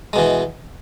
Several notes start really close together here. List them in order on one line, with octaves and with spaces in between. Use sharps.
G#3 B2 E3